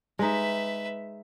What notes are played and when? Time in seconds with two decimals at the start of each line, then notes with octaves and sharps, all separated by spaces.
0.19 G#3 D#4 B4 E5